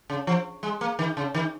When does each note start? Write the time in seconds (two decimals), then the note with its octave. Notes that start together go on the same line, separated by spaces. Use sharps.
0.10 C#3
0.27 F3
0.63 G#3
0.81 A#3
0.99 D#3
1.17 C#3
1.35 D#3